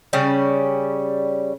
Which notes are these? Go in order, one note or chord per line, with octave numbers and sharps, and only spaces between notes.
C#3 G3 C#4